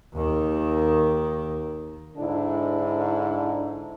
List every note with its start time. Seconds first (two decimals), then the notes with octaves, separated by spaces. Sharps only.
0.15 D#2 D#3
2.18 G#2 D3 D4 E4